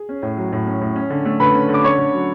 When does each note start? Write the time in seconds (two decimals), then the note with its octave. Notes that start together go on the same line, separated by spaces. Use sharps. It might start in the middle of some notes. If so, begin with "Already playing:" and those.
Already playing: G#4
0.09 C#4
0.23 A2
0.37 F#3
0.53 A2
0.67 C#4
0.81 A2
0.96 C#4
1.10 D3
1.25 A3
1.40 D3 B4 B5
1.54 C#4
1.69 D3
1.74 D6
1.84 C#4 C#5 C#6
1.98 D3
2.13 F#3